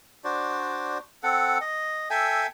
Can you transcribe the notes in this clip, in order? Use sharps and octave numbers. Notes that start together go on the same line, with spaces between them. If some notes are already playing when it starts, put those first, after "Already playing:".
D4 F#4 C5 D5
C4 A4 F#5
D#5
A4 E5 G5 G#5